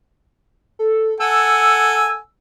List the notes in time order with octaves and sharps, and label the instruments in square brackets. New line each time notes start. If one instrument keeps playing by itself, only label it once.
[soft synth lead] A4
[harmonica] A4 F#5 G#5 [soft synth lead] E6